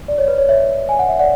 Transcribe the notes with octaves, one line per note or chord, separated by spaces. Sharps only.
D5
C#5
B4
C#5
C#5 E5
G#5
F#5
E5
D5 F#5